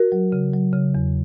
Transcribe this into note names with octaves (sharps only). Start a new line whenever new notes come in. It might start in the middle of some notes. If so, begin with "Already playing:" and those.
Already playing: F#4 A#4
F#3
C#3
F#3
C#3
E2